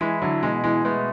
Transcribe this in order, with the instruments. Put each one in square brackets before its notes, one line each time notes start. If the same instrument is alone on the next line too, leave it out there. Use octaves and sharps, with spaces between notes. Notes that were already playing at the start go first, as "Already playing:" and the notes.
[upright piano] E3 G#3 [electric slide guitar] E4
[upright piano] D3 F#3
[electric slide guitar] B2 [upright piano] E3 G#3
[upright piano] E3 G#3
[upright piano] G#3 B3 [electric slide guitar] A3